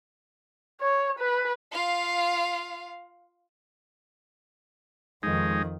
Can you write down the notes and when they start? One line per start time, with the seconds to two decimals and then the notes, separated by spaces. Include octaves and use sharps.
0.81 C#5
1.19 B4
1.72 F4 F5
5.23 F2 D#3 G#3 D#4